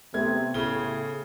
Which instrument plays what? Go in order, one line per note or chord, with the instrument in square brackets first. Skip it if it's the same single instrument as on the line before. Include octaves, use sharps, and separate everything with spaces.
[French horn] C3 [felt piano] A3 B3 C4 [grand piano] G#6
[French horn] A2 [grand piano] C#3 G7